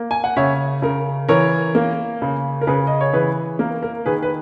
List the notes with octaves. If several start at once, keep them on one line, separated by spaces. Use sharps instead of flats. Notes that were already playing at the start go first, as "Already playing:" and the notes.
Already playing: A#3
G#5
F#5
C#3 C#5 E5
C#3 A#4
E3 A#4 C#5
A#3
C#3
A#4
C#3 G#4 B4
D#5
C#5
E3 G#4 B4
A#3 A#4
A#4
D#3 G#4 B4
B4